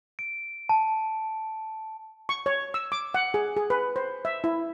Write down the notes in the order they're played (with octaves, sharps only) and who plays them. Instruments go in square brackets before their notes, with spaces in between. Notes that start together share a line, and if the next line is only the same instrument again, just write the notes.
[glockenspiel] D7
A5
[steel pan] C#6
C#5
E6
D6
F#5
G#4
G#4
B4
C5
E5
E4